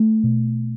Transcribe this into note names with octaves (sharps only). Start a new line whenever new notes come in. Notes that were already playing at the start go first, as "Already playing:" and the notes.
Already playing: A3
B2